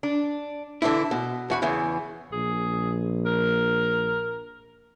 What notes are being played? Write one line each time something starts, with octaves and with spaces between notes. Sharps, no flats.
D4
D3 E3 D4 E4
B2
E2 F#4 B5
E2 C#3 E3
A#1 G#4
A#4